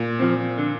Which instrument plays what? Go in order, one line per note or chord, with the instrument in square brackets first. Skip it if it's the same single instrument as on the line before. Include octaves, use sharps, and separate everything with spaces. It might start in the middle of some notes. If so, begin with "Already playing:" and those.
Already playing: [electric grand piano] A#2
[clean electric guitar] F3 C4
D3